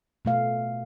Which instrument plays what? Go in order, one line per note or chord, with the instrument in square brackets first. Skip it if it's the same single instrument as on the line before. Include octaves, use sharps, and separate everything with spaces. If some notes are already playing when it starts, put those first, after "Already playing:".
[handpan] B2 A3 F5